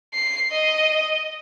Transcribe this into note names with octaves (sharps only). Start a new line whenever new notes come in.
C7
D#5